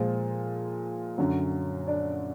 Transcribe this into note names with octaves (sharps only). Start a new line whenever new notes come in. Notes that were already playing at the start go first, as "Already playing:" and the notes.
Already playing: A#2 F3 G#3
F#2 D3 F#3
D4 D5